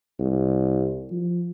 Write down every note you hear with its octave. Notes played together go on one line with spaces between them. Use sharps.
C2
F3